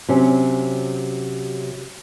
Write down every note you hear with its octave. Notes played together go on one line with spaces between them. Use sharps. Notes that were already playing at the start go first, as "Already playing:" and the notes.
C3 F#3 C#4